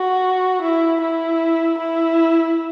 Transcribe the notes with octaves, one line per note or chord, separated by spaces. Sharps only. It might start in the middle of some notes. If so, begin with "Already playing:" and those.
Already playing: F#4
E4
E4
E4